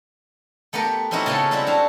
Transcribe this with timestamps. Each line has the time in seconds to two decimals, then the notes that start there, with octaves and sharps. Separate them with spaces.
0.73 A3 B3 G4 A#4 B4
1.11 C4 C#4 D#4 E4 F#4
1.26 C#3 G#3 B3 C#4 A4
1.51 G3 C4 C#4 E4 F#4
1.67 D4 F#4 G4 F5